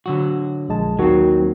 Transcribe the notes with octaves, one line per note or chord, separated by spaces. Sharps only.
D3 F#3 F#4
A#1 G#3 A5
D#2 D#3 F#3 C4 F#4